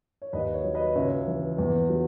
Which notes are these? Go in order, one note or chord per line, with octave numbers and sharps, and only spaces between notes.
C#5
D#2 B4 D#5
C#5
F#3
B4 D#5
C#2 C#5 E5
E3
E2
F#3